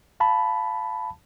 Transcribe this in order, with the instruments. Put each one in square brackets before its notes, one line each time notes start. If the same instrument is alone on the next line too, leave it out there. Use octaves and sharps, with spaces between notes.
[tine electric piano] F5 A5 B5